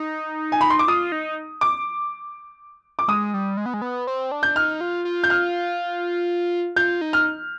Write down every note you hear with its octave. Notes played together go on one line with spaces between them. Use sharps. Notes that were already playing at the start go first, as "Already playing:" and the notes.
Already playing: D#4
G#5
B5
C6
D6
F4 D#6
D#4
D6
D6
G#3 D#6
G3
G#3
B3
G#3
B3
C4
D4
G6
D#4 F6
F4
F4
G6
F6
F4 G6
D#4
F6